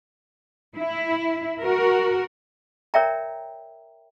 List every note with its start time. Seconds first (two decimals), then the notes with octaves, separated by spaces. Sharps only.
0.77 E4
1.61 F#4 A#4
2.94 A#4 C#5 D5 E5 G5 A#5